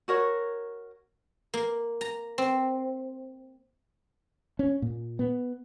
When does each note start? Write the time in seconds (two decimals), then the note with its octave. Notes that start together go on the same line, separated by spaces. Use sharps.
0.08 F#4 A#4 C#5
1.54 A#3
2.01 A#5
2.38 C4
4.59 C#4
4.82 A#2
5.19 B3